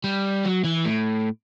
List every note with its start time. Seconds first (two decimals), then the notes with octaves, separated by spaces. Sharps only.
0.04 G3
0.45 F#3
0.65 E3
0.86 A2